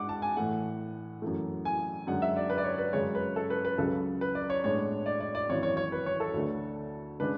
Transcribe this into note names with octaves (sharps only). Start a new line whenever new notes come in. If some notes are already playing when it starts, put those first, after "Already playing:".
Already playing: G#2 G#3 D4 F#5 D6
A5
G#5
A2 E3 A3 F#5
F#2 E3 A3
G#5
F#2 D3 G#3 F#5
E5
D5
B4
D5
C#5
B4
F#2 C#3 G#3 C#5
B4
A4
B4
B4
C#2 C#3 F#3 A4
B4
D5
C#5
A2 G#3 B3 D4 C#5
D5
D5
D5
G#1 F#2 E3 C#5
C#5
C#5
B4
C#5
A4
D2 D3 A3
C#3 G#3 D4 B4